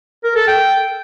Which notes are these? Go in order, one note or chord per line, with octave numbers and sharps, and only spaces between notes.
A#4
A4
G5